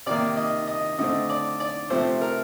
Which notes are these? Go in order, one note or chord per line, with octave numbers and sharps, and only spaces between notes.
C3 D#3 A#3 D5
D#5
D#5
D3 A3 C4 D#5
D5
D5
C3 F3 A3 C4 C5
A#4